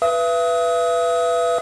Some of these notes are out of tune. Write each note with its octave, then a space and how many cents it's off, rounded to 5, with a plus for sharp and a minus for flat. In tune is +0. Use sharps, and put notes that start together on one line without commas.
B4 +0 E5 +40 D#6 +30